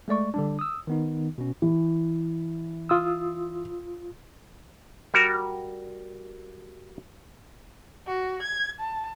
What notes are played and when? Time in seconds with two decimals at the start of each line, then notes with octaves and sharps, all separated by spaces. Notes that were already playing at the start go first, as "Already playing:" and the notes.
0.08 G#3 A3 D5 C#6
0.34 D3 G3 D4
0.59 D#6 E6
0.87 D#3 B3 D#4
1.38 B2 C#4
1.62 E3
2.89 F4 D#6 E6
5.14 G3 F#4 A#4
8.07 F#4
8.43 G#6
8.80 A5